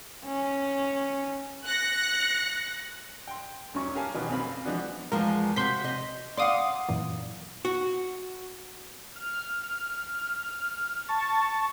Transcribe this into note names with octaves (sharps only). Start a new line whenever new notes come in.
C#4
F#6 A#6 C#7
G5 C6
D#1 F#2 C#4 C#6
C#4 G4 A#4 F5 G#5 A5
B2 D#3 E3 B3 C#4
F1 B1 C4 F5 B5
E3 F3 G#3 B3 D4 F#4
E2 F3 G#3 A#4
C3 F#4 C6 G6 B6
D#5
D5 F5 F#5 C6 D6 D#6
F#2 A#2 E3
F#4
F6
A5 C#6 A6